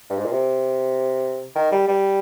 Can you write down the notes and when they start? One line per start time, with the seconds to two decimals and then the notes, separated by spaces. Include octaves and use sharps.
0.10 G2
0.17 G#2
0.25 A#2
0.32 C3
1.56 D#3
1.72 G3
1.88 G3